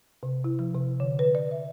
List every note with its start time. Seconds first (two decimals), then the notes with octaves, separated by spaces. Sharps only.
0.23 C3
0.44 E4
0.59 F3
0.74 C3
1.00 D3
1.19 B4
1.35 D5
1.51 E5